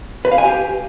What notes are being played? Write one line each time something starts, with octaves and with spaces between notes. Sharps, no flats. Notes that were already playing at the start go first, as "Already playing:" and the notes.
B4
F5
G#5
G4